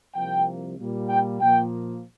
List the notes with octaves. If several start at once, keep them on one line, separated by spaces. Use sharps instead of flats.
C2 C3 F3 A#3 G5
A#2 G3 A#3
G5
A#2 F3 A#3 G5